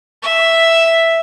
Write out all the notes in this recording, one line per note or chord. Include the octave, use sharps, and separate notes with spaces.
E5